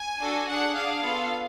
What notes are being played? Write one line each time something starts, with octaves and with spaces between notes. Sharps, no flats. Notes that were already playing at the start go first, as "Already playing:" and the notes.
Already playing: G#5
D4 F#4 A4
D4 G#4 F#5
D4 G#4 F5
B3 F4 A4